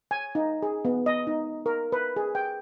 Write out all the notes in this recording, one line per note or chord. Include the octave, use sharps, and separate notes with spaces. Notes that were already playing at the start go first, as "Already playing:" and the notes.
G#5
D#4
G#4
B3
D#5
D#4
A#4
B4
G#4
G5